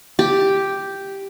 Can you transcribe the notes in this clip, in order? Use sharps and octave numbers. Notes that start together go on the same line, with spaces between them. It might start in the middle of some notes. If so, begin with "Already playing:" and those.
G4